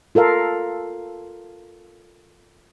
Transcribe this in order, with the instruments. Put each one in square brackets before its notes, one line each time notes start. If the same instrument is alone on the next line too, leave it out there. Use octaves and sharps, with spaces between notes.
[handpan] F4 A4 A#4 F5